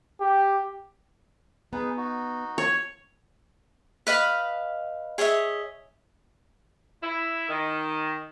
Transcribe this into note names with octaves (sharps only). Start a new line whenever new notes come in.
G4
B3 D#4 G#4 B4
D#4 F#4
C#5
B4 D#5 F5 B5
G#4 C#5 D#5 E5
E4
D#3